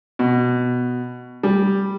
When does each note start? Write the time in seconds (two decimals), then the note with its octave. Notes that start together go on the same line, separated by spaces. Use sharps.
0.19 B2
1.43 G3